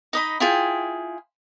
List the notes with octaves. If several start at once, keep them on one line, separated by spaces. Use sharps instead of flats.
D#4 D#5 B5
E4 F4 G#4 G5